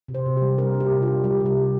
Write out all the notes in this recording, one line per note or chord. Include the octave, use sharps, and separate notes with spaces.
C3
C5
C3
G3 G4
D4 A#4
D4
G4
C3
F4
D4
G3 G4
C3
G4
C3